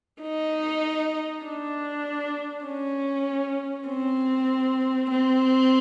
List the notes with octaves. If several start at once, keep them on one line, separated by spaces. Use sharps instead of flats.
D#4
D4
C#4
C4
C4